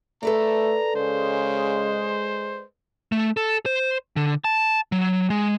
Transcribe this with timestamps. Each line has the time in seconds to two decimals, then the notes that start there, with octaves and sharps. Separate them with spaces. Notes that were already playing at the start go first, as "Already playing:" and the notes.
0.23 A3 A4 B4 D5 A#5
0.96 C#3 G#3 C5
3.12 A3
3.37 A4
3.66 C5
4.16 D3
4.44 A5
4.92 F#3
5.30 G#3